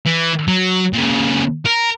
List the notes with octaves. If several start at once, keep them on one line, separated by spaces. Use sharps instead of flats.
E3
F#3
A#2 C#3
A#4